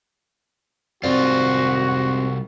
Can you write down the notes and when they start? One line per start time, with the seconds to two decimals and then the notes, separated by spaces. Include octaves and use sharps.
1.03 C2 G#2 C4 F4 F#4 D5